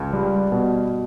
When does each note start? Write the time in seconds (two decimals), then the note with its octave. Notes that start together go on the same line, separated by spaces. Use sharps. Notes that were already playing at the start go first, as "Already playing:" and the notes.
Already playing: C#2
0.13 G3
0.52 B2